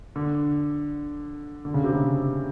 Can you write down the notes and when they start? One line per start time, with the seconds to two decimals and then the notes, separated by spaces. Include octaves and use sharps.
0.16 D3
1.65 D3
1.74 C#3
1.84 C3
1.94 C#3